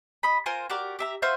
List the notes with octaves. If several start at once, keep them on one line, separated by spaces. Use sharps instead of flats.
D#5 B5
F4 A#4 C5 G#5
F#4 G4 A#4 D5
G4 E5 A#5
F4 F#4 C5 E5